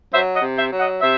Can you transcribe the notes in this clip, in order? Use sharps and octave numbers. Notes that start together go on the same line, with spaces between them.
F#3 C5 E5
D#5 F#5
C3
C5 E5
F#3
D#5 F#5
C3 C5 E5